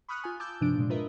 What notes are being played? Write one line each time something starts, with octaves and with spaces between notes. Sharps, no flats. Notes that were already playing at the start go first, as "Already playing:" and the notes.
B5 C#6 D#6 F6 F#6
F4 G#5
A5 D6 E6 G6
G2 C3 F3 D4 D7
A#2 G#3
F4 A#4 B4 D#5 E5